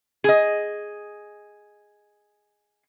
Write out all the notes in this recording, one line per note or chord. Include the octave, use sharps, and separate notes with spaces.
G#4 D#5